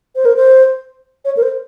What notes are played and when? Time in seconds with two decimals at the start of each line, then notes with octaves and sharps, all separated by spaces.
0.16 C5
0.25 A#4
0.36 C5
1.25 C#5
1.37 A#4
1.43 C5